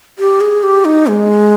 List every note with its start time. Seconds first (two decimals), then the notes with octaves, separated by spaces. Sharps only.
0.19 G4
0.41 G#4
0.63 G4
0.85 D#4
1.07 G#3